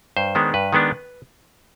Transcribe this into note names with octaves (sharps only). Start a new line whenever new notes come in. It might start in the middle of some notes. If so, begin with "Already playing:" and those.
G2 C5
D#3 G#3 B3 D4
G2 B4
D#3 G#3 B3 D4